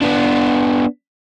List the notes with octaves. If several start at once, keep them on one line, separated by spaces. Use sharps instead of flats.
B3 D4